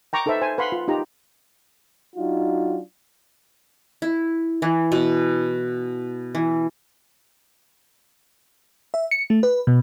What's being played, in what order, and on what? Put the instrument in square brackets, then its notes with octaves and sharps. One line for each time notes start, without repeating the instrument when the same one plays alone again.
[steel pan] G5 A#5 C#6 D6
D#4 A4 B4 C5 E5
C5 G#5
B4 F5 F#5 B5 C6
F4
D#4 F4 G4 A#5
[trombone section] F#3 D4 D#4 F4 F#4
[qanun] E4
E3
B2
E3
[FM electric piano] E5
C#7
A3
B4
B2